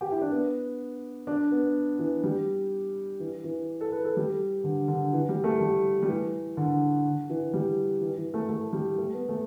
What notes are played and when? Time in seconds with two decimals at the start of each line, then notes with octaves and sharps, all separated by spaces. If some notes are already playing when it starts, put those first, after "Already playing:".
0.01 G4
0.11 E4
0.21 D4
0.31 B3
1.27 D4
1.51 B3
1.99 E3
2.24 G3
3.19 E3
3.44 E3
3.81 A4
3.92 B4
4.05 A4
4.17 G3
4.64 D3
4.88 D3
5.13 E3
5.29 G3
5.44 A3
5.60 G3
6.02 G3
6.08 E3
6.57 D3
7.29 E3
7.54 G3
8.01 E3
8.17 E3
8.34 A3
8.49 A3
8.73 G3
8.98 A3
9.13 B3
9.29 A3